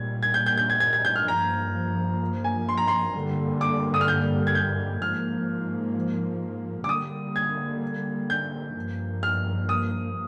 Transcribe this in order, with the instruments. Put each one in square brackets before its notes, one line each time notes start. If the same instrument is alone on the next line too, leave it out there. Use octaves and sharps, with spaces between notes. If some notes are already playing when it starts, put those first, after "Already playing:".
Already playing: [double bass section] A#2 G3 A#3 [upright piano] G#6
[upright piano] G#6
G6
G6
G6
G#6
G#6
G#6
G6
F6
[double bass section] G2 F3 A#3 [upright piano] A#5
[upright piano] G#5
C6
A#5
C6
[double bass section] G2 D3 G3 A#3
[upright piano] D6
D#6
F6
G6
G#6
G6
[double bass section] G#2 F3 A#3 [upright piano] F6
[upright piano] D6
[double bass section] D3 G3 A#3 [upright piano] D#6
[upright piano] G#6
G6
[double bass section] G2 F3 A#3
[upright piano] F6
D#6